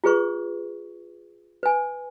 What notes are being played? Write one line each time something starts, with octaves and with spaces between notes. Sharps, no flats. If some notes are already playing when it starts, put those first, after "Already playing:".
F4 G#4 B4 C#6
B4 G#5